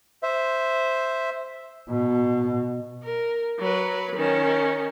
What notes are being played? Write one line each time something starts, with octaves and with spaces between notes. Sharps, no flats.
C5 E5
B2
A#4
F#3 B4
D#3 C#4